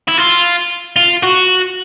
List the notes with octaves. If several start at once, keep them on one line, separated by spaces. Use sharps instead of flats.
E4
F4
F4
F#4